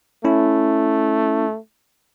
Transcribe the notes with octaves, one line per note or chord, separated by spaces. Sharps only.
A3 C#4 E4